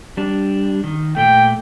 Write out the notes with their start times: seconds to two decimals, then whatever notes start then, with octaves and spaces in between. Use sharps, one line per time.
0.17 G3 D4
0.84 D#3
1.16 A#2 A3 G5